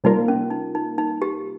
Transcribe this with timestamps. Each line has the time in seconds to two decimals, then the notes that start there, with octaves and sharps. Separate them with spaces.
0.04 C3 G3 A#3 D#4 F4 A#4
0.28 C#4
0.50 D#4
0.75 D#4
0.98 D#4
1.22 G4